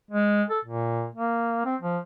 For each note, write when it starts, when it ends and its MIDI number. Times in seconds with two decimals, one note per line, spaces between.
0.11 0.43 56
0.50 0.59 69
0.65 1.07 46
1.15 1.63 58
1.66 1.75 60
1.82 1.98 53